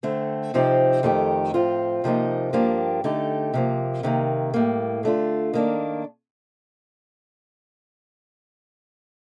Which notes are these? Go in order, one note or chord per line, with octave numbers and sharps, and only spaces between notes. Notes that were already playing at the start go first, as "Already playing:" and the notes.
D3 A3 C4
C3 F3 C4 D#4 G4
F2 D#3 A3 D#4 G4
A2 F3 C4 F4
C3 F3 A#3 D#4
G2 F3 A#3 D4 G4
D3 A3 D#4 G4
C3 F3 A#3
C3 D#3 A#3
A2 G3 A#3
D3 A3 D4 F4
D#3 A#3 D4